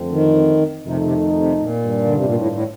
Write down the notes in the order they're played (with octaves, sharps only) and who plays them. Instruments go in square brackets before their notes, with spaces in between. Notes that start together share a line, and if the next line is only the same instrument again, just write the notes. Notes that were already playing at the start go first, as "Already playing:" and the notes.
Already playing: [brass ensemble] F2 D3 A3 C4
[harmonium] D#3
[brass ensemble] F2 D#3 A3 D#4 [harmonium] C3
[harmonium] C3
C3
A#2
[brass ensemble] G2 D#3 G3 D4 F4
[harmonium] D3
C3
A#2
A2
A2